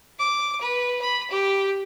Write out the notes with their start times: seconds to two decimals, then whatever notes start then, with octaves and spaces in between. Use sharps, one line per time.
0.19 D6
0.60 B4
1.01 B5
1.30 G4